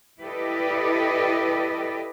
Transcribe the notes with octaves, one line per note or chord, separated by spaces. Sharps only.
E4 G4 A4 B4 D5 D#5